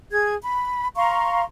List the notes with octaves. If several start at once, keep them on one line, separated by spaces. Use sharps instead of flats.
G#4 G#6
B5
F5 A#5 C6 C#6